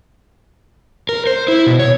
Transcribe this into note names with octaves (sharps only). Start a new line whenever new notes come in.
A#4
C5
E4
B2
C#5